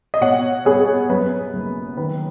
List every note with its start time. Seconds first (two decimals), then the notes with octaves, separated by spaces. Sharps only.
0.14 D#5
0.21 B2 C#5 F#5
0.65 B3 G#4 C#5
1.09 F#2 B4
1.54 F#1
1.97 D#3 B4